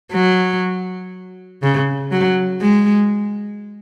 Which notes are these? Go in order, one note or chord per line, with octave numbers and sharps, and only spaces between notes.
F#3
C#3
F#3
G#3